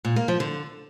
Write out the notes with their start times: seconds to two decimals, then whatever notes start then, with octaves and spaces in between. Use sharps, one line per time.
0.05 A#2
0.16 A#3
0.28 F3
0.40 D3